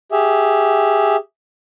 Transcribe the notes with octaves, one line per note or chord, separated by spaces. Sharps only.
G4 G#4 E5